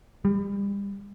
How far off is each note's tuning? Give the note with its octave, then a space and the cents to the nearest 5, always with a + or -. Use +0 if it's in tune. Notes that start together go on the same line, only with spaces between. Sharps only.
G3 +35